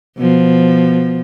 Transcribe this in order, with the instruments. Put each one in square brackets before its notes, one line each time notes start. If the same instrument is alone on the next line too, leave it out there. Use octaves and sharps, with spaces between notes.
[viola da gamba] B2 F3